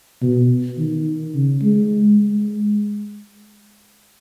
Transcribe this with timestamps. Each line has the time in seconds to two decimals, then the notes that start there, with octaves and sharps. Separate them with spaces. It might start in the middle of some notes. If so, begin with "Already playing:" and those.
0.22 B2
0.78 D#3
1.35 C#3
1.62 G#3
2.18 G#3